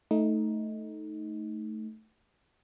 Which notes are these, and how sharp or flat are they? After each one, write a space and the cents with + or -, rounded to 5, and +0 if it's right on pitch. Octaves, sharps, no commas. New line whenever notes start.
A3 -5 D#4 +10